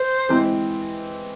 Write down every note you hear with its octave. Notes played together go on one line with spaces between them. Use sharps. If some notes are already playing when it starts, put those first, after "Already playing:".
Already playing: C5
E3 G#3 C4